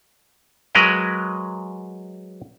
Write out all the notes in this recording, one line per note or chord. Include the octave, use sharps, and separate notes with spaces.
F#3 G#3 A#4 B4 D#5